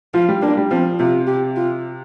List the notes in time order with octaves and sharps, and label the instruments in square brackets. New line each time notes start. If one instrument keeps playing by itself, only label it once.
[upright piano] F3 [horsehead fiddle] F4
[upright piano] G3
[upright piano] A#3 [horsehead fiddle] D4
[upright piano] G3
[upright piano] F3 [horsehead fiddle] C4
[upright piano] C3 [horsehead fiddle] F4
[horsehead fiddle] G4
F4